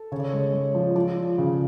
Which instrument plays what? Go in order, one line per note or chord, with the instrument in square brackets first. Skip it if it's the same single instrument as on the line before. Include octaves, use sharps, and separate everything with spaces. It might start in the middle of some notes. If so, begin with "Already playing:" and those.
Already playing: [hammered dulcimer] A4
[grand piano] C#3 [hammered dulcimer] C#5
[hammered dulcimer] D5
[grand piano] G#3 [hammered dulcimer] C#5
[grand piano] G#3
F3
[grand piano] F3 [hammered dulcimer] D5
[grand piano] F3
C#3